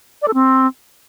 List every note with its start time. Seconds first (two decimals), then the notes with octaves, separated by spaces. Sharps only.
0.22 D5
0.28 A4
0.34 C4